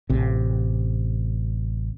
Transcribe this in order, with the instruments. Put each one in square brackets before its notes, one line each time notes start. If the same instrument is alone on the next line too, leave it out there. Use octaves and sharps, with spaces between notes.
[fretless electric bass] A1 C3